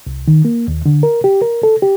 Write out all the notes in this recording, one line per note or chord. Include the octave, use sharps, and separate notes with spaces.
C2
D#3
A#3
D#2
D3
A#4
G4
A#4
A4
G4